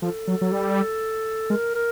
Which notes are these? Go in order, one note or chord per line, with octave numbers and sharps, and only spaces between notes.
F3 A4
F#3
F#3
G3
G#3 A#4
A#4